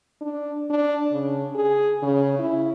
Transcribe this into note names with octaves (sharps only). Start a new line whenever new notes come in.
D4
D4
C#3
G#4
C#3
E4